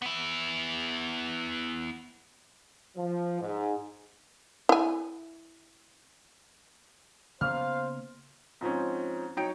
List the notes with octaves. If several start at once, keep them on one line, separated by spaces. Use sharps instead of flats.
B3 E4
F3
G#2
E4 G#5
C#3 A#3 B3 C5 F5 F6
G#2 F3 C4 C#4
F#3 D#4 C#5 G5 D7